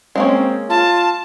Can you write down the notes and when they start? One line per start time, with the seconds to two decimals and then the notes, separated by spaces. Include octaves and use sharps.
0.16 G#3 A#3 C4 C#4
0.70 F4 A5